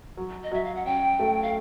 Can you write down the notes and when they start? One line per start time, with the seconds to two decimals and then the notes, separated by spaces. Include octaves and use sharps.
0.17 F#3
0.44 D#5
0.52 F#3 E5
0.64 F5
0.75 F#5
0.85 C#4 G5
1.19 A3
1.42 F5